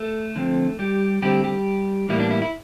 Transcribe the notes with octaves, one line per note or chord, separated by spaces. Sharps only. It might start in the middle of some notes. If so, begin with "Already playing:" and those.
Already playing: A3 A4
D3 F3 C4
G3 G4
D3 G3 A3 C4 G4
G3 G4
A2 E3 G3 A#3 E4
D4
E4
E4